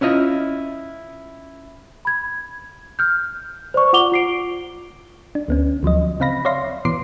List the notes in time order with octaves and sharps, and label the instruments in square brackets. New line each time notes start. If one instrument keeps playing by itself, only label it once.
[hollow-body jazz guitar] C#4 E4 F4 D#5
[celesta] B5 G#6
F6 G6
C5 D5 C#6
F4 F#5 D6 F7 G7
F4 C7 D7
[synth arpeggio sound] D4
D2 B3 C#4
D2 F3 F#3 D#5
C#3 C4 F5 B5 A#6
C#5 D5 E5 F5 C6 A#6
B2 E3 B3 C6 D6 C7